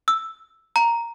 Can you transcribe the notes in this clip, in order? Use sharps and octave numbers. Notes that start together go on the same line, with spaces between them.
E6
A#5